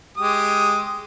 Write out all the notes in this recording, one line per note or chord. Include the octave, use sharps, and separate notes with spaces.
G#3 G4 D#6